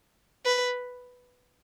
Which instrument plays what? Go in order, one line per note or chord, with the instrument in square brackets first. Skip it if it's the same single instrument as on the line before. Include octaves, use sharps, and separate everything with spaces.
[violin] B4